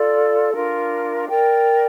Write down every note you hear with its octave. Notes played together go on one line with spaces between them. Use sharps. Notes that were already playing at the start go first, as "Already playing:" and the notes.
Already playing: F4 A4 D5
D4 F4 A#4
A#4 D5 G5